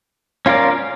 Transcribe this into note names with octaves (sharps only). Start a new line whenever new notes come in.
C#4 F4 A#4 D5